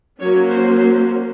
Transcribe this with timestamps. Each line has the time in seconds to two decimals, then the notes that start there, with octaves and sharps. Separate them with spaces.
0.20 F#3 A#3 C#4 C#5
0.50 C5
0.78 C5